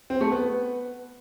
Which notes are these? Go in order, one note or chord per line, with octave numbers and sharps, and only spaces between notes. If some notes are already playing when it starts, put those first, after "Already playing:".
C4
A3
B3